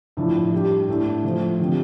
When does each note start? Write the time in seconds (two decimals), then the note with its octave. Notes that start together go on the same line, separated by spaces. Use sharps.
0.17 A2 F3 D4
0.52 G3 D4 G4
0.88 A2 A3 D4
1.24 F3 A3 F4 C5
1.60 D3 F3 C4 G4